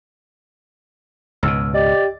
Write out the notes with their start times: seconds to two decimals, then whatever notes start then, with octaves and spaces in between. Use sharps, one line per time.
1.43 C#2 G#2 B2 E6 F6
1.74 G4 D5 D#5